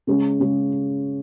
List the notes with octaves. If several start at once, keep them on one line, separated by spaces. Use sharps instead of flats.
C#3 G#3 C#4
C#3 G#3 C#4